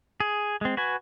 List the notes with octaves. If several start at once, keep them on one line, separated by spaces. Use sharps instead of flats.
G#4
G#3 C4
F#4 B4 G#5